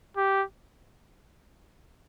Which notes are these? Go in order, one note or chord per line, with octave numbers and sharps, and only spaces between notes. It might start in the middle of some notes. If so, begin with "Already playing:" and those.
G4